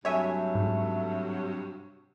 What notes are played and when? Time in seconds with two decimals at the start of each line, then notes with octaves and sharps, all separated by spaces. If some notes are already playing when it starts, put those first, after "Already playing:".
0.05 G2 C3 F#3 A3 C#5 E5 G#5
0.55 G#2